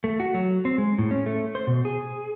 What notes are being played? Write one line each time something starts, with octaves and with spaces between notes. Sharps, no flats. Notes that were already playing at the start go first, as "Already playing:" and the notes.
A3
F#4
F#3
C4
G#3
A2
C#4
A3
C5
B2
G#4